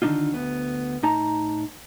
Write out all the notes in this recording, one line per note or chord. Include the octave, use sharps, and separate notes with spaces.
D3 D#3 F#3 D4 D#4 F4
D2 B3
A2 D#4 A5 A#5